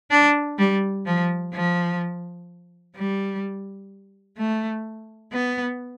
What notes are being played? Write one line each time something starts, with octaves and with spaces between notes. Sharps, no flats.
D4
G3
F3
F3
G3
A3
B3